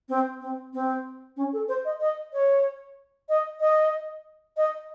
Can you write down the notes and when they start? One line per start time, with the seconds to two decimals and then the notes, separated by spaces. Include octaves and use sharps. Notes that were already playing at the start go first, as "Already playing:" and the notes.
0.09 C4
0.41 C4
0.73 C4
1.37 C#4
1.53 A4
1.68 C5
1.85 D#5
2.00 D#5
2.33 C#5
3.29 D#5
3.60 D#5
4.57 D#5